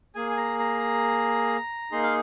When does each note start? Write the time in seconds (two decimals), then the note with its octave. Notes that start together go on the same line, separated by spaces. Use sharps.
0.15 A#3 G#4 G#5
0.30 G#5
0.37 A#5
0.59 A#5
1.92 A#3 D#4 G#4 C6
2.03 F5